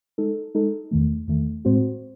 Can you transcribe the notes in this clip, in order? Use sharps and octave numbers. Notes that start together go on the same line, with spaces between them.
G#3 D#4 A4
G#3 D#4 A4
E2 D#3 A3
E2 D#3 A3
A2 G#3 C4 F#4 C5